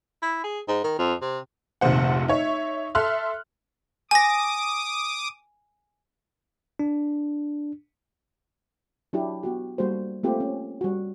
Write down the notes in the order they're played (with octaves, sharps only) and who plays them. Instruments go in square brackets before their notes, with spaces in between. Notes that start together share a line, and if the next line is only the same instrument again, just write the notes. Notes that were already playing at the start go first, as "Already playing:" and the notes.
[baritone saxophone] E4
G#4
G#2
D#3
F2
C3
[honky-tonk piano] F1 A#1 C3 D#3 C5 F#5
D#4 C#5 E5
A4 E5 C6 F6 F#6
[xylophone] G#5 A#6 [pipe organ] D6 D#6
[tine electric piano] D4
[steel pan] F#3 D4 E4 G4
B3 F#4 G4
G3 A#3 D4 F#4 A4 C5
A3 A#3 C4 F4 G4 C5
C#4
G3 F#4